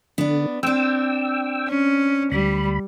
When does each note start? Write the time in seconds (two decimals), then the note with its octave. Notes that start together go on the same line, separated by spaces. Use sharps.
0.18 D3 B3 D4
0.63 C4 D4 G5 E6
1.68 C#4
2.32 D2 G3 B5